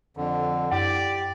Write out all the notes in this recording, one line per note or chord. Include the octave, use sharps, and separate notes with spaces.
F2 D3
F#2 G4 D5